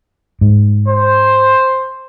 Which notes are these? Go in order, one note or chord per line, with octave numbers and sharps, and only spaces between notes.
G#2
C5